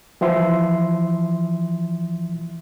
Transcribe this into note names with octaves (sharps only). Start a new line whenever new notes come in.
E3 F3 E5 C6